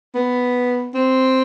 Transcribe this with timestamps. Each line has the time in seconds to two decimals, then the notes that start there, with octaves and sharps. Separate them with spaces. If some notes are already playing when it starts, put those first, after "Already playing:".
0.15 B3
0.94 C4